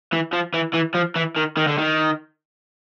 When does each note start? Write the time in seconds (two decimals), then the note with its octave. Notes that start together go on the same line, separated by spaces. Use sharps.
0.12 E3
0.33 F3
0.54 E3
0.74 E3
0.95 F3
1.16 E3
1.37 D#3
1.57 D#3
1.68 D3
1.78 D#3